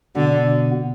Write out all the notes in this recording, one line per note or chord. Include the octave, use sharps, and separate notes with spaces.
B2 D3 B3